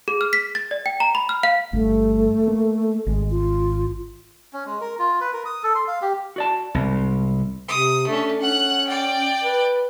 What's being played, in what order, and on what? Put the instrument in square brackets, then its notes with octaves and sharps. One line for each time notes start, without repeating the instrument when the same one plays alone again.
[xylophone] G#4
F6
B6
A6
D5
G5
A#5
B5
F6
F5
[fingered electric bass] G1 G2 [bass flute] A3
[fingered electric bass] A#3
[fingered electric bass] G#1 [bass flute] G#3
[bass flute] F4
[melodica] C#4
G#3
A#4
F4
B4
A#4
D#6
A4
C6
F5
G4
[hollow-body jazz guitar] F#4 D5 A5
[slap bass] C2 [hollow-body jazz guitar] G#2
[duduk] C3 [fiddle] D#6
[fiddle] A3 C#4 [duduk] D4
[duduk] C#4 [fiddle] F#5 F#6
[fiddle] D5 G5
[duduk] B4